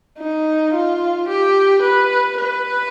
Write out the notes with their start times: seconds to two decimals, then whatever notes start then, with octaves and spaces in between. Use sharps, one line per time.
0.19 D#4
0.74 F4
1.29 G4
1.82 B4
2.38 B4